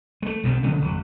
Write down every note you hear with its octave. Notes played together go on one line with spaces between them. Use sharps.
G#3 A3
B1 B2 E3 C4
C#3 F3 A3 B3
G#1 F2 B2 F#3